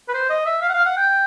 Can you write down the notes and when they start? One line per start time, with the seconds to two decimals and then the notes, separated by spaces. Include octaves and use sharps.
0.08 B4
0.14 C5
0.29 D#5
0.46 E5
0.62 F5
0.69 F#5
0.74 F5
0.85 F#5
0.97 G5